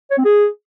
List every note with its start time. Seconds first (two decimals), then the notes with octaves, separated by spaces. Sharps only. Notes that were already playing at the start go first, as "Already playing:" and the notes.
0.11 C#5
0.18 C4
0.25 G#4